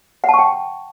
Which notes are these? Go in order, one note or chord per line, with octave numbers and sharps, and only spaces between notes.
F#5 G5 A5 C#6